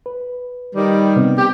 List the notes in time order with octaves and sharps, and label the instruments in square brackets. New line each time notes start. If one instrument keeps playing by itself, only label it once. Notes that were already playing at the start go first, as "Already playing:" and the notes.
[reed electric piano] B4
[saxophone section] D#3 G3
[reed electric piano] C3 B3 C4
[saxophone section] G4